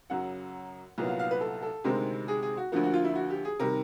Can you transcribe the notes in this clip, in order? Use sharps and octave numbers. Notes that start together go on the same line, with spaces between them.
F#2 C#3 F#3 F#5
C2 A#2 F#3 B3
F5
F5
B4
A4
A4
D2 C3 D#3 G#3 C4 A#4
G#4
G#4
F#4
D2 D3 F3 A#3 F#4
F#4
F4
E4
F#4
G4
G#4
C3 D#3 G3 A#4